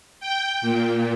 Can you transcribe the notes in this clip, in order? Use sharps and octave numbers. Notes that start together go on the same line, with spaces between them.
G5
A#2